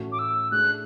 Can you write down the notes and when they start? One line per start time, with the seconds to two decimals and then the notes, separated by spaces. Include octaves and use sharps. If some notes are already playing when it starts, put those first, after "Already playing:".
Already playing: A2 E3 A3 C#4 F#4
0.12 D6
0.19 E6
0.51 A3 D4 G#4 F#6